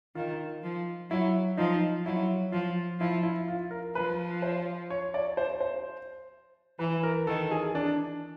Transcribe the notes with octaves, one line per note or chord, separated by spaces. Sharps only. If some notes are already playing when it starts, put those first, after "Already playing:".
D#3 F4
F3
F#3 E4
F3 D#4
F#3 E4
F3 F4
F3 E4
E4
F4
A#4
F3 B4
C5
C#5
D5
C5
C5
E3 B4
A#4
D#3 A4
G#4
D4